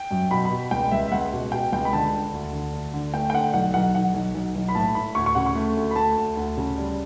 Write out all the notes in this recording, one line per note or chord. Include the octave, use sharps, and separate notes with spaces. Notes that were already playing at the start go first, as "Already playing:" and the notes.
Already playing: G5
F#2
B2 B5
B5
B2
C#2 G5
C#2 E5
E5
C#2 F#5
B2
B2 G5
C#2 G5
B5
D3 A5
D3
D2
D3
D2
D3
A3 G5
G5
D3 F#5
B1 F#5
B1 F#5
B1 F#5
B1
B1
B1
B5
A2 A5
A2 B5
D2 C#6
C#6
C#3 F#5
C#6
A3
D2
B5
A3 A5
D2
D2
C#3
G3